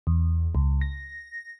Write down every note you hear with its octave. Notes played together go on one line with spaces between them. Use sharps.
E2
C#2
A#6